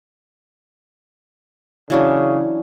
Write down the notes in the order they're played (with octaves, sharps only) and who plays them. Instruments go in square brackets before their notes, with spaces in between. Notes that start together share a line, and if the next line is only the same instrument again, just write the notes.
[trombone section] C#3 [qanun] E3 F#3 D4